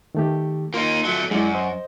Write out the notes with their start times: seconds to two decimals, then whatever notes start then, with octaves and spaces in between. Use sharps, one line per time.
0.15 D#3 A3 G4
0.74 A#3 D#4 F4 C6
1.05 F#3 A3
1.31 F#2 G#3 E4 D5
1.55 C5 D#5